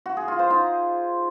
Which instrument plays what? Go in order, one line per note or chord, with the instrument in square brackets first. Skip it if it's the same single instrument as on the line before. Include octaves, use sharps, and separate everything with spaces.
[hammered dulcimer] F#4
G#4
F4
C5
D#4